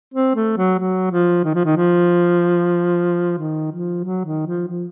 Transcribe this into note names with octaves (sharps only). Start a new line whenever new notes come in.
C4
A3
F#3
F#3
F3
D#3
F3
D#3
F3
D#3
F3
F#3
D#3
F3
F3